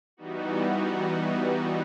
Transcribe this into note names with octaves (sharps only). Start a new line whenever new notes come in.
E3 G3 B3 D#4 F#4